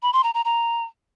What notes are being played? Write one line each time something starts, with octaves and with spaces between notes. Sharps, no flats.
B5
C6
A#5
A#5
A#5